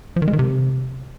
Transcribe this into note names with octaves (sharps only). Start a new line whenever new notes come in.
F3
D#3
G#3
D#3
C3